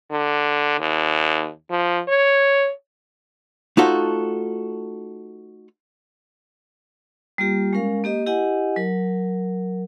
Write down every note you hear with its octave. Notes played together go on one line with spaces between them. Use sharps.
D3
D#2
F3
C#5
A3 D#4 F4 F#4 A4 C5
G3 A#3 F4 G4
G#3 C#4 A#4 F5
A#3 G4 D#5
E4 G4 D#5 F#5 G#5
F#3 A#4